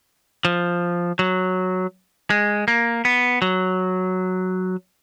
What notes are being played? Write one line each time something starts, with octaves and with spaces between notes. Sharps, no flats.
F3
F#3
G#3
A#3
B3
F#3